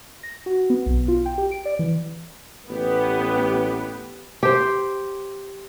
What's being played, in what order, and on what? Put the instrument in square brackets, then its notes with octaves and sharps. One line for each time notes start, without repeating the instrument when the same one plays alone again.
[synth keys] A#6
F#4
B3
B1
F4
G5
G4
D7
D5
E3
[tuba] A1 [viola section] B3 G4
[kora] G4 C5